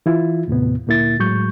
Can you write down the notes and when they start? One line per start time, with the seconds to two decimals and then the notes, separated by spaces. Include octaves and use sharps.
0.06 E3 E4 F4
0.48 D#2 A2 C3 B3
0.87 D2 A#2 A#3 E4 A6
1.20 A2 F#3 G#3 C#6 G6